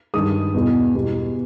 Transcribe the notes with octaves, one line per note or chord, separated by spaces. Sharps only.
G2 D#3 G#3 D#6
E2 B2 G#3
E2 B2 G3